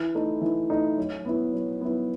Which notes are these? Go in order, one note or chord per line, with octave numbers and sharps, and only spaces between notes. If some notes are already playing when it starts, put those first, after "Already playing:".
Already playing: E3
A3 D#4
E3
A3 D#4
F#3
B3 E4
F#3
B3 E4